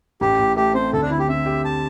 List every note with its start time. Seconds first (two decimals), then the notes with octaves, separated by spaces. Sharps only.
0.21 A1 G4
0.38 A2
0.56 A3 G4
0.74 C4 C5
0.93 D2 A4
1.02 D4
1.10 D3 E4
1.19 G4
1.28 C4 E5
1.46 G4
1.65 A5